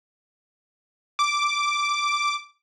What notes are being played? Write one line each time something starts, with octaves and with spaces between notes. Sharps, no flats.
D6